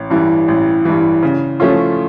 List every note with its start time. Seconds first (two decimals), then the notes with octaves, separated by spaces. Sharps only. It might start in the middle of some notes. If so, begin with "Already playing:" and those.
Already playing: A1
0.10 G2 E3
0.48 A1
0.85 G2 E3
1.23 C#3
1.60 F3 A3 C#4 F4